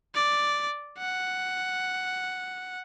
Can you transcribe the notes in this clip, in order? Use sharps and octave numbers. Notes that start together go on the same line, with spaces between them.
D5
F#5